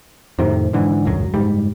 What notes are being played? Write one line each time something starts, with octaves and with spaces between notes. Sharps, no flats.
F2 A2 C3 D#3
G#2 D3 E3
D#1 C#2 F#2 F#3
F#1 G#2 G3